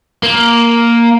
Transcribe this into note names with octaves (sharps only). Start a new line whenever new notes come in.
A#3